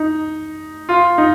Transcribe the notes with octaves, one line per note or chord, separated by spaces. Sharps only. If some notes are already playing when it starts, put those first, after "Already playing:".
Already playing: D#4
F4
D#4